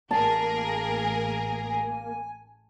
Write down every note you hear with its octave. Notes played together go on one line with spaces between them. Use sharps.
A1 A#3 G#4 A#4 A5
G#5